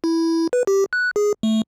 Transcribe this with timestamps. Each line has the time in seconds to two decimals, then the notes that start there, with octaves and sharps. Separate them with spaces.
0.04 E4
0.53 B4
0.67 G4
0.93 F#6
1.16 G#4
1.43 A3